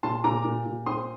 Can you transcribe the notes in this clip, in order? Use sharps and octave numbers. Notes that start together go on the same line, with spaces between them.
A#2 A5 C6
A#2 A#5 D6
A#2
A#2
C4 C6 D#6